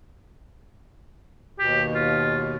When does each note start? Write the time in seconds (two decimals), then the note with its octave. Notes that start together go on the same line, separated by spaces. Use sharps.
1.59 D#2 B2 G4
1.94 F4